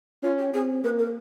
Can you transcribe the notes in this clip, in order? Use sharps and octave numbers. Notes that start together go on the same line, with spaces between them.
C#4 F4
G4
C4 G#4
A#3 B4
A#4